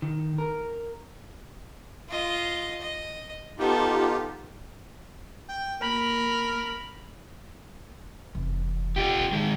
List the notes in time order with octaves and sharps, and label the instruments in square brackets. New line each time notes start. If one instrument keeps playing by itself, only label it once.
[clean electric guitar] D#3
A#4
[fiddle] F4 D#5
D#5
[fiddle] B3 A4 [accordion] D#4 F4 G4
[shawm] G5
[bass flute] A#3 [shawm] A#4 [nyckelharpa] B5
[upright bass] F1 E3
[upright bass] A#2 [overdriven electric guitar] F4 G4
[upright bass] A#2 E3
[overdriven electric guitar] D#3 G#3